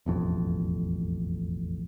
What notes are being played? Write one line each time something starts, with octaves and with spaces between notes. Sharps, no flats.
E1 A1 F2